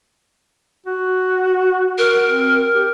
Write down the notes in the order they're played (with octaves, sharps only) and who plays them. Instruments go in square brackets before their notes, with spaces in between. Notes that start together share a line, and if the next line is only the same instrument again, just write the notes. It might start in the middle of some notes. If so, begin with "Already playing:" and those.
[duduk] F#4
[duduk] F#4 [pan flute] A#4
[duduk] C4
G4